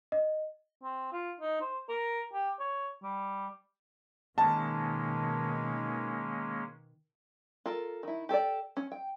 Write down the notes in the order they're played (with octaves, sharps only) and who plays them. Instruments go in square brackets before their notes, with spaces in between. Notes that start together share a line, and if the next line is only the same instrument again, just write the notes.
[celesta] D#5
[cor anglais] C4
F4
D#4
C5
A#4
G4
C#5
G3
[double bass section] B2 D#3 [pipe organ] G#3 A#3 C#4 [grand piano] A5
[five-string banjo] F4 A4 A#4
D#3 E4
G4 A4 C5 D5
C#4
G5